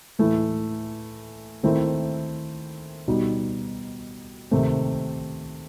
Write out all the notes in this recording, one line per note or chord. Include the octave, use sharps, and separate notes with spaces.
A2 E3 A3 E4
D#3 A3 C4 E4
B2 G3 D#4
C3 D#3 A3 C4